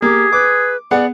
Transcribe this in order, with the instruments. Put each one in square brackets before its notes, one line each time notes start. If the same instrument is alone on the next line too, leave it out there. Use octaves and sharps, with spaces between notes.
[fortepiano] A#3 [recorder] G4 [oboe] G#4
[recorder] B4 [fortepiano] D6
[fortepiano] B3 G#4 F#5 [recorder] D5